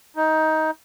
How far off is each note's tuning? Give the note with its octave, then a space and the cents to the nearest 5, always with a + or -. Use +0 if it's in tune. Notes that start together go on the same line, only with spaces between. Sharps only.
D#4 +15